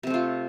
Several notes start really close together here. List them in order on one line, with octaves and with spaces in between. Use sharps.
C3 C4 A3 F4